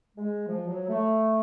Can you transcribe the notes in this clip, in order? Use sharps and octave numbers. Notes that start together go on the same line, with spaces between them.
G#3
F3
F#3
A3